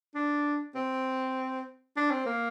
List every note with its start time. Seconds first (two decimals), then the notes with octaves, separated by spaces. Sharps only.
0.15 D4
0.75 C4
1.97 D4
2.11 C4
2.26 A#3